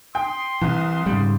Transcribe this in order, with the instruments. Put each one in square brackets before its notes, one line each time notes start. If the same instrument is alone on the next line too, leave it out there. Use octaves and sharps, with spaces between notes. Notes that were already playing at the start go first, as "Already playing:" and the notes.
[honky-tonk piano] G5 [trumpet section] C6 D#6
[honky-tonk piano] C2 [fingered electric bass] E3
[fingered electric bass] G#2 C#3 G3